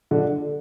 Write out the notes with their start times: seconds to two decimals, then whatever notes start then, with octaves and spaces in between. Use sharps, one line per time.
0.11 D3